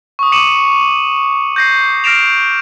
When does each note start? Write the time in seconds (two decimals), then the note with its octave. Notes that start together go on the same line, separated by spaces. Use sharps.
0.19 C#6 D#6
0.32 D6 C#7 D#7 E7 F#7
1.56 G6 A#6 C7
2.04 F6 A#6 C7 D7 E7 F7